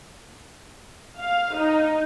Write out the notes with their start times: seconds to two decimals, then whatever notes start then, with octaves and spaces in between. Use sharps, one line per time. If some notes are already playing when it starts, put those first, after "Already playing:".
1.19 F5
1.56 D#4